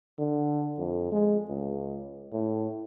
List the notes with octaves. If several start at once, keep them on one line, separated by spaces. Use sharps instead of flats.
D3
F2
G#3
C#2
A2